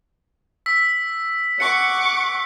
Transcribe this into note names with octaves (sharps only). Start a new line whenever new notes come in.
E6 B6
F#5 C#6 D6 C#7